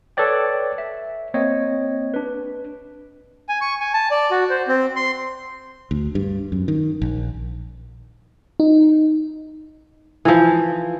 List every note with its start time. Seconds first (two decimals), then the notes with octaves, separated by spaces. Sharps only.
0.17 A4 B4 C#5 D5 G5
0.78 E5
1.34 A#3 C4 C#5 D#5
2.14 D4 B4
3.49 G#5
3.61 C#6
3.80 G#5
3.94 A5
4.11 D5
4.31 F#4
4.50 C5
4.68 C4
4.96 C6
5.91 D2
6.15 G2
6.52 F#2
6.68 D#3
7.02 A#1
8.60 D#4
10.25 E3 F3